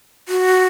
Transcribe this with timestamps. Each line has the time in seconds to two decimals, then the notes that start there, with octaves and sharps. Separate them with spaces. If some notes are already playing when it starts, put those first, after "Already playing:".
0.28 F#4